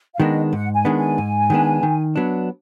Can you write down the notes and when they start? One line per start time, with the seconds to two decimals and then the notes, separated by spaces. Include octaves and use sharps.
0.15 F5
0.20 D#3 G#3 B3 D4 D#5
0.53 G#2 F#5
0.74 G#5
0.85 D#3 G#3 B3 D4
0.96 G#5
1.18 G#2
1.50 D#3 G#3 B3 D4
1.83 D#3
2.16 F#3 B3 D4